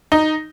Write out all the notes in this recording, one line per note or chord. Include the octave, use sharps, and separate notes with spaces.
D#4